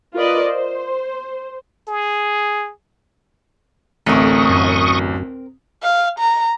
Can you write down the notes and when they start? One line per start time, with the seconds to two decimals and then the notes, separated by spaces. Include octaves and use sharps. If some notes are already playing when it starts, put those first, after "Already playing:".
0.14 F4 A#4 B4 D5 D#5
0.47 C5
1.88 G#4
4.06 A1 D2 A3 C4 A#4 C#6 D#6
4.50 F#2
5.83 F5
6.19 A#5